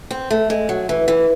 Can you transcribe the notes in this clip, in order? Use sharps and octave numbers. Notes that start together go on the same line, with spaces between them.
C4
A3
G#3
F#3
E3
E3